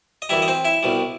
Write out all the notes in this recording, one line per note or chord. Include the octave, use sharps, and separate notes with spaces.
D#5
F#2 E3 G3 E4 E5
D#5
C4 C5
E4 E5
C2 B2 G3